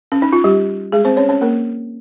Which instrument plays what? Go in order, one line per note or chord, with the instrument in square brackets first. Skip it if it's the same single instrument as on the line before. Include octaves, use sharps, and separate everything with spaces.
[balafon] C#4
D#4
F4
G3 G4
G#3 G#4
C4 C5
C#4 C#5
C#4 C#5
A#3 A#4